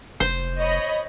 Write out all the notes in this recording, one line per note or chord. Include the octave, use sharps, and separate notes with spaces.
F1 C5
C#5 D#5 B5